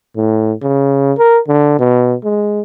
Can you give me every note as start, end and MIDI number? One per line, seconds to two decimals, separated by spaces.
0.16 0.53 45
0.62 1.13 49
1.18 1.39 70
1.48 1.78 50
1.79 2.15 47
2.24 2.61 56